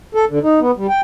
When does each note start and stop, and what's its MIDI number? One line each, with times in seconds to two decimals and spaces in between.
0.15 0.25 69
0.29 0.39 50
0.43 0.60 63
0.60 0.71 59
0.77 0.87 55
0.89 1.01 79